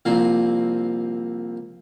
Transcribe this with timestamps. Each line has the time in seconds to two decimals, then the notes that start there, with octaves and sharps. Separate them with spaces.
0.05 C2 F3 A#3 C4